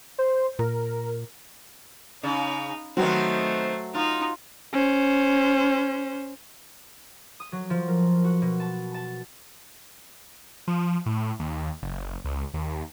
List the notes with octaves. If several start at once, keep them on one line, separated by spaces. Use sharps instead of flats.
C5
A#2 A#4
C#3 D#4
D#3 F#3 A3 B3 C4 C5
D#4 F4
C#4 C5
D#6
F#3
F3
A#4
F#4
B2
A5
A5
F3
A2
D#2
F#1
C#2
D#2